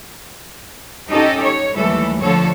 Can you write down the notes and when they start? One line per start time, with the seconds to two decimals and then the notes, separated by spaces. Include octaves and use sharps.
1.09 C#4 D#4 G4 A4 D#5
1.42 C#5
1.75 D#2 E3 F#3 G3 A3 A4
2.21 D3 F3 A3 A4 C#5